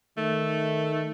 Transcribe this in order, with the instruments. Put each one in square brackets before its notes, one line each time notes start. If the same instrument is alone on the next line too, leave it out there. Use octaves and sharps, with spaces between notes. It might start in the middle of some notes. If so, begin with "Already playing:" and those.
[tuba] D#3 [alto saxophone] A3